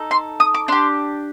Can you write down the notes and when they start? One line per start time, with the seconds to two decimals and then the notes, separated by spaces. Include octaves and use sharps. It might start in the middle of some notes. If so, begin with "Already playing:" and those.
Already playing: D#4 A4
0.11 C6
0.40 D#6
0.54 D6
0.68 D4 G4 C6